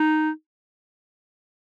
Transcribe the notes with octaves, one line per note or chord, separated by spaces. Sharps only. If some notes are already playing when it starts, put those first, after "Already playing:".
Already playing: D#4